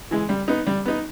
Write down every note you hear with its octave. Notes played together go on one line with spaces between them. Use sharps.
E3 G#3
G3
B3 D#4
G3
B3 D#4